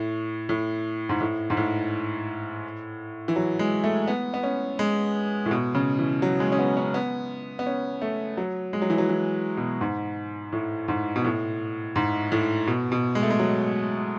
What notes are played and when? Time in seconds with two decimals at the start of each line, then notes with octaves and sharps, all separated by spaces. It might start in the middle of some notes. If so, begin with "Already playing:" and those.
Already playing: A2
0.49 A2
1.09 G#2
1.20 A2
1.50 G#2
1.57 A2
3.28 E3
3.36 F#3
3.59 G#3
3.84 A3
4.07 B3
4.34 B3
4.43 C#4
4.79 G#3
5.46 A2
5.51 B2
5.75 C#3
5.99 E3
6.22 F#3
6.40 G#3
6.52 C#4
6.59 B3
6.77 C#4
6.94 B3
7.59 B3
7.66 C#4
8.02 A3
8.37 F#3
8.73 G#3
8.82 F#3
8.90 E3
8.98 F#3
9.09 E3
9.57 B2
9.81 G#2
10.53 A2
10.88 G#2
11.16 B2
11.25 A2
11.96 G#2
12.32 A2
12.67 B2
12.92 B2
13.15 G#3
13.23 A3
13.30 G#3
13.39 F#3